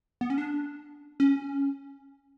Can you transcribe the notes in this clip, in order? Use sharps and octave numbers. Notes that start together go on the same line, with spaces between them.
B3
C#4
D4
C#4